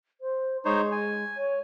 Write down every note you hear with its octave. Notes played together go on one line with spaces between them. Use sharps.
C5
G#3 D#4 C5 C#5
G#5
C#5